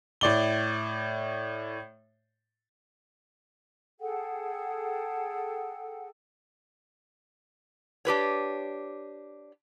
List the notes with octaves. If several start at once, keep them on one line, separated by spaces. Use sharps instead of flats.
A2 D5 G7
G#4 A4 F#5 G5
D4 G4 B4 C#5